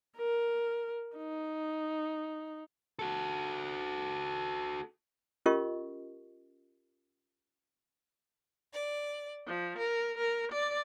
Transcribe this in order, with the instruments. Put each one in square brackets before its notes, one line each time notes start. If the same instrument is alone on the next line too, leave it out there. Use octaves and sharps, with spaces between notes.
[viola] A#4
D#4
[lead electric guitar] F#4 A4
[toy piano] C#4 F4 G4 A#4 D#5 C#6
[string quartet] D5
F3
A#4
A#4
D5